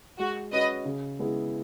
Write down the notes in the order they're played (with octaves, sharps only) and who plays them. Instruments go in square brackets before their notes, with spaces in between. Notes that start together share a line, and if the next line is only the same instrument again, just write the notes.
[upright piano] G#3 [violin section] F#4
[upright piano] C#4 F#4 [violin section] B4 D#5
[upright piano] C#3
G#3 B3 E4 G#4